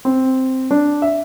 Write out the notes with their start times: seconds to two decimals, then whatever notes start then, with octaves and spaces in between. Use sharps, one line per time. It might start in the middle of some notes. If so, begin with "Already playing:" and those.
0.05 C4
0.71 D4
1.02 E5